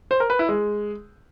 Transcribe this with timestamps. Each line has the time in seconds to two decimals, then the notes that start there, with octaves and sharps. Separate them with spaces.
0.11 C5
0.20 A#4
0.30 B4
0.39 E4
0.49 G#3